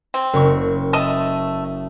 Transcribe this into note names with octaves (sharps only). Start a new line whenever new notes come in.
C4
F#1 C#6
A3 D#5 A5